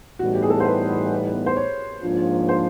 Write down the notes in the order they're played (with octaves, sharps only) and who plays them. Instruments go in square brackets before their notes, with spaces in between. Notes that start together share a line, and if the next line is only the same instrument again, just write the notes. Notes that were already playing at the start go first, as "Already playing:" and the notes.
[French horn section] A2 E3 G3 B3 D#4 [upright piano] F#4
[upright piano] G4
G#4
A4
C5
B4
C5
C#5
[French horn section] G#2 F3 A#3 D4 F4
[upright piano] C5